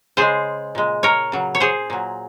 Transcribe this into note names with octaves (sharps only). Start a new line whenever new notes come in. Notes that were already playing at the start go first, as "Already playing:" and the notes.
C#3 G#3 G#4 C5
A#2 G#3
A#4 C#5
C#3 F#3
C#5
G#4 C5
A#2 F#3